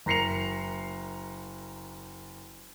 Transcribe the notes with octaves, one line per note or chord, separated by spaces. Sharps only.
F#1 A#5 A#6 C7 C#7 F7